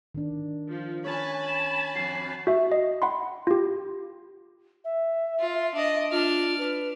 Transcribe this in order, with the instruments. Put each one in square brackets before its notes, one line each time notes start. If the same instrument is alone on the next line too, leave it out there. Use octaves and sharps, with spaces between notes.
[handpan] D#3 D4
[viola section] F3
[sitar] C#4 B4 C#5 [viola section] G#5 A5 B5
[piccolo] E7
[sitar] F2 F#4 [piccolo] C7
[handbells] F#4 E5 C#6
D#5
F#5 B5 C6
F4 G4
[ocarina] E5
[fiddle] F4
D4 D#5
[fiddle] D4 F6 [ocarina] F4
[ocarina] B4